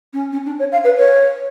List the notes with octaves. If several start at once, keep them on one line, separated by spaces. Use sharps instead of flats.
C#4
C#4
D4
C#5
F5
B4
C#5